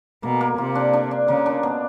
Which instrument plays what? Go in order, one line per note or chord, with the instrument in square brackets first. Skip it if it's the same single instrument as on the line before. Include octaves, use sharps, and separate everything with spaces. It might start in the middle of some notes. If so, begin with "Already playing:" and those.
[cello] B2 [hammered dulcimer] A#3
[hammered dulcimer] A#3
[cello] C3 [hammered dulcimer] F4
[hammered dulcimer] D4
D4
D4
[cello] C#3 [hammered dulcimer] A#3
[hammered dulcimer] D4
B2